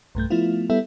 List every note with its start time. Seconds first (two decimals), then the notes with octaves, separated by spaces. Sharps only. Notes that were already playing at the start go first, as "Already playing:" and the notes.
0.15 B1 G2 A3 G6
0.30 F3 A3 B3 E4 F4
0.70 G3 B3 E4 A4 E5